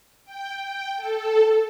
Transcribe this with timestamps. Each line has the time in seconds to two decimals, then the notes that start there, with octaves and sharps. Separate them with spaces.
0.25 G5
0.62 G5
0.96 A4